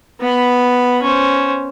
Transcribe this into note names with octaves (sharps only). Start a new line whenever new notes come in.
B3 B5
C#4 C5